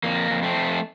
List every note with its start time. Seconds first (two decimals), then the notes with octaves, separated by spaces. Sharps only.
0.04 F2 A#3
0.31 F2
0.43 A3 C4
0.56 F2